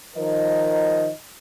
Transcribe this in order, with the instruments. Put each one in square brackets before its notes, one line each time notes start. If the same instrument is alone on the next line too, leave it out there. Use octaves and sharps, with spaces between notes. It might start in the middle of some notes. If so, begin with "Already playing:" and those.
[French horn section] D#3 F3 A#4 D#5